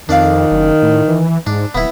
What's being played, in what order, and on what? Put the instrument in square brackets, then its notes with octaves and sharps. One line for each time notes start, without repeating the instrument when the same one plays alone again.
[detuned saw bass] F2 [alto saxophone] D#3 [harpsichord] D4 D5 F5
[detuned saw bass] F#1
A2
E3
[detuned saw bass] G#2 [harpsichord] D4
[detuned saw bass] D1 [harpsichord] B3 E4